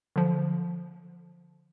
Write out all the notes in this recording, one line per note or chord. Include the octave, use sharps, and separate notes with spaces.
D3 F3